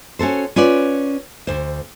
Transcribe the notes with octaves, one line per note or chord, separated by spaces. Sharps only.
C#4 F#4 A4 C5
C#4 F4 B4 D5
D2 C5